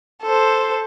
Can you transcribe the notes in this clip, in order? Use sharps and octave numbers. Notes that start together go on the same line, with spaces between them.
A4 C5